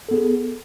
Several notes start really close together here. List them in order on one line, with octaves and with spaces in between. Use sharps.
A4 B3 G#4